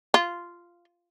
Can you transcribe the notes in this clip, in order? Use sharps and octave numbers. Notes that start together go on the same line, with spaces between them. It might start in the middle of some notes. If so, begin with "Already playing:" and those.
F4